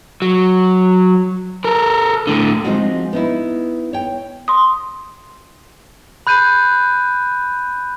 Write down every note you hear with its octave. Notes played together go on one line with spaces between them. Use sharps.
F#3
A4 A#4
A2 D3
F3 G#3 C4 D#4 F4 F#4
B3 D#4 E4
C#5 G5
C6 D#6
B5 F#6 G6 D#7